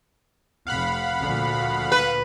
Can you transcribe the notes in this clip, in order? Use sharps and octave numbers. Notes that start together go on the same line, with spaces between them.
F1 F5 F#5 B5
D2 A#2 F3
B4